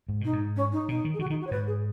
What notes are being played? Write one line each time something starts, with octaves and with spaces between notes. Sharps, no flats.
G#2
B2 D#4
G#2
C#4
D#4
B2 D#4
D#3
G#4
D#3 F#4
C#3
D#3 D#4
F#4
C#5
G#2 B4
G#4